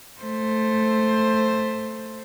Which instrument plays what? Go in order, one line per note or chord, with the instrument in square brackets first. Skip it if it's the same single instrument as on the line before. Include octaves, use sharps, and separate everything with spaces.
[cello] A3 C5